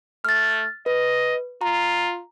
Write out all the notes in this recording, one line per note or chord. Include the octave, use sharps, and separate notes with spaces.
A3 F6 A6
B4 D#5
F4 A#5